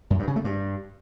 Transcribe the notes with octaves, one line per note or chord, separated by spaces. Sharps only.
F#2
G2
C#3
A3
G2